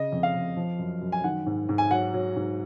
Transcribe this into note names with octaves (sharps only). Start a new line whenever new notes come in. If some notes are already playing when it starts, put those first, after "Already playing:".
Already playing: C#3 D#5
F2
F5
F2
F3
F#2
F#2
G#5
D#3 F#5
G#2
G#2
G#5
F#3 F#5
F#3
G#2